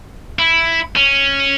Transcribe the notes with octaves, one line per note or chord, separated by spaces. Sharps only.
E4
C#4